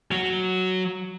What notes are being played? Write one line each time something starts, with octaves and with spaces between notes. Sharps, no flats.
F#3 F#4